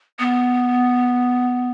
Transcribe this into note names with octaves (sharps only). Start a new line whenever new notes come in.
B3